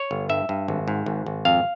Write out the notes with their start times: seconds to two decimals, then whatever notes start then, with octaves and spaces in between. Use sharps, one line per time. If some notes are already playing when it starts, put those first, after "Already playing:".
Already playing: C#5
0.11 G1
0.29 G2 E5
0.49 G2
0.68 G#1
0.88 G#2
1.06 G#1
1.26 G#1
1.45 F2 F5